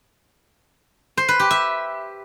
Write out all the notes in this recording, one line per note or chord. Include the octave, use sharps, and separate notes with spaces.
C5
B4
G4
E5